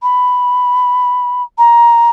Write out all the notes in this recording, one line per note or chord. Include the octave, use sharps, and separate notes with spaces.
B5
A#5